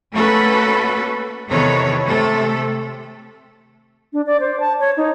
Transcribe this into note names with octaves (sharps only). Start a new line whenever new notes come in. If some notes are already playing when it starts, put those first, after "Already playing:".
A3 A#3 C#4 F#4 A4 B4
E2 C3 D#3 A4 B4 C#5
C3 A3 A4
D4
D5
C5
A5
C#5
D#4